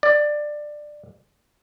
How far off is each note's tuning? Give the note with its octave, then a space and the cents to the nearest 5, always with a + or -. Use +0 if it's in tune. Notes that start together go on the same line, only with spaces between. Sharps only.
D5 +15